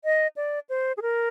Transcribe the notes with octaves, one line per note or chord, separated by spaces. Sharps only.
D#5
D5
C5
G#4
A#4